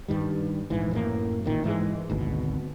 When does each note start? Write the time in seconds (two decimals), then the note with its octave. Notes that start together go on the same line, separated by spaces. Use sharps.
0.08 G2 D#3 G3
0.70 A#1 G#2 E3
0.91 F#2 A2 A#3
1.44 A1 A#2 D#3
1.64 G#2 E3 F#3 G#3
2.10 G#1 D2 B2